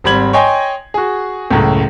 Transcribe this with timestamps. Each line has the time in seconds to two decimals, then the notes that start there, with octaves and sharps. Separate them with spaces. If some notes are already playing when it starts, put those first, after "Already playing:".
0.04 G#1 G3 C4 B5 G#6 F#7
0.33 C#5 D#5 G5 G#5 C6
0.94 F#4 G#4
1.51 C#2 F#2 A2